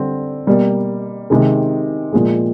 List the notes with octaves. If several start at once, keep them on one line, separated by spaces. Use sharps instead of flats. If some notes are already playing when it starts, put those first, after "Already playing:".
Already playing: D3 G3 C4
B2 G3 A#3
C3 D#3 G#3
A#2 F3 G#3